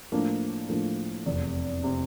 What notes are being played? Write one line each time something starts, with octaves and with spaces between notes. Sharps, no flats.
A2 F3 A#3 D4
A2 F3 A#3 D4
F1 E2 C3
C3